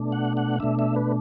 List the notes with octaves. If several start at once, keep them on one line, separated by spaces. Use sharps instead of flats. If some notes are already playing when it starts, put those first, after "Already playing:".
Already playing: B2 A3 D4
F#5
F#5
B2 A3 D4 E5
E5
B4